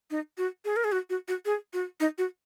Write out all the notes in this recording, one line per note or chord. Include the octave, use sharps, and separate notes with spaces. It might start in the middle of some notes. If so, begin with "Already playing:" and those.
D#4
F#4
G#4
A#4
G#4
F#4
F#4
F#4
G#4
F#4
D#4
F#4